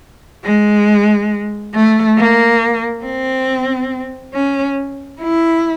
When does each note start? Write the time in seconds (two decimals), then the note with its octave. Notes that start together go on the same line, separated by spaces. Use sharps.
0.44 G#3
1.75 A3
2.17 A#3
3.04 C4
4.33 C#4
5.21 E4